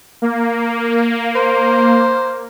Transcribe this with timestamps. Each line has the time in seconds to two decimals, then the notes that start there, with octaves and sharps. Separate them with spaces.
0.22 A#3
1.35 C5